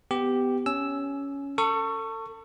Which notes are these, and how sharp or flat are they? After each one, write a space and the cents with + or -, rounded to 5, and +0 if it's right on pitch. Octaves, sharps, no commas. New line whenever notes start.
B3 +20 G4 +0
C#4 +10 G#5 +20 E6 +0
A4 +35 C#6 +0